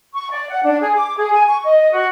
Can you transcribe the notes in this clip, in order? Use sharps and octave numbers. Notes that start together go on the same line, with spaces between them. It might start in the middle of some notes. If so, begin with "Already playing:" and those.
C#6
D5
F#5
D4
G#4
D6
G#4
G#5
C#6
D#5
F#4